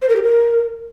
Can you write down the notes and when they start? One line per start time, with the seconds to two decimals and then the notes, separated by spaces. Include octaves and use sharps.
0.02 C5
0.09 A#4
0.16 G4
0.23 A#4